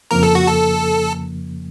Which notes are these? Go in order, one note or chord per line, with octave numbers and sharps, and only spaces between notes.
F2 C#3 F3 A#3 A#4
A4
F#4
A4